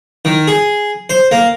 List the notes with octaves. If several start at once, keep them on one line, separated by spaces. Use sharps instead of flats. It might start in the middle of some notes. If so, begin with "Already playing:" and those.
D#3
G#4
C5
A#3